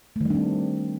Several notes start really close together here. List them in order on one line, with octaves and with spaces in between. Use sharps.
A3 D#3 G3 D4 C4